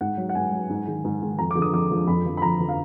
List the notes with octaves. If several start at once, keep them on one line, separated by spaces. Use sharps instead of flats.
G#2 F#5
F#3
F#5
G#2 G#5
F#3
G#2
D#3 G#3
G#2
D#3 G#3
F2 A#5
D6
D3 F3 G#3
D#6
F2 D6
D3 F3 G#3
F2 B5
D3 F3
B5
F2 A#5
D3 F3
F5